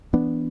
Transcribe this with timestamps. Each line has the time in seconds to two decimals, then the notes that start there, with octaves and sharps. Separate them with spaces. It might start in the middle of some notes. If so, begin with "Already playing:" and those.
0.13 E3 B3 D4